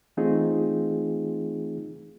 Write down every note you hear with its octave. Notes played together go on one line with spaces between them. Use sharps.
E3 A3 C4 D#4 F4 G#4